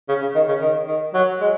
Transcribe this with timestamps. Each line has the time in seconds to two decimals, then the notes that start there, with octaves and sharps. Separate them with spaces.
0.09 C#3
0.22 C#3
0.35 D#3
0.48 C#3
0.61 D#3
0.87 D#3
1.14 F#3
1.40 G#3